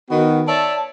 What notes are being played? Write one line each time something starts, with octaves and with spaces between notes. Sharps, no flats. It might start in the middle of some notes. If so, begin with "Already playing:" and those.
D#3 B3 F#4
C#5 D5 E5 A5